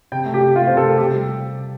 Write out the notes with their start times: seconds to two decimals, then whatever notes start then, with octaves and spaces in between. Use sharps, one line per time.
0.12 C3 G5
0.26 A3
0.34 G4
0.41 C3
0.54 A3 F4
0.67 C3 C5
0.77 A4
0.83 A3
0.98 C3 G4
1.13 G3